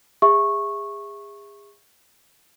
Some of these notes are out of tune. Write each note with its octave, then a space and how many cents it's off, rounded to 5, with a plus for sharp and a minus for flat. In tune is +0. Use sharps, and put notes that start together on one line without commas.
G#4 -30 E5 +0 C#6 -15